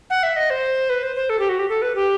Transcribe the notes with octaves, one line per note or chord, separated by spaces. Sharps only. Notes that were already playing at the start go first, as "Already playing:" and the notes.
F#5
E5
D#5
C5
B4
C5
C5
A4
G4
F#4
G4
A4
B4
G4